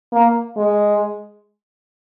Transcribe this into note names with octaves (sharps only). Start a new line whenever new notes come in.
A#3
G#3